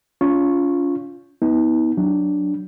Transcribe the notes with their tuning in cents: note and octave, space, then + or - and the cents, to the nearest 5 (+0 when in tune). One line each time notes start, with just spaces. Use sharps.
C#4 +35 F4 +0 C#6 -10
B3 +0 D#4 +40
F#3 +0 D4 +0